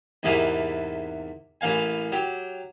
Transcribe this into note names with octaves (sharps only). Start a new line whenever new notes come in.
E2 G#2 C3 E3 A#3
A1 E3 A#3 F5 G#5
F#3 G4